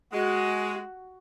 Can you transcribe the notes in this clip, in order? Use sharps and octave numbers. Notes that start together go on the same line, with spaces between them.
G#3 F#4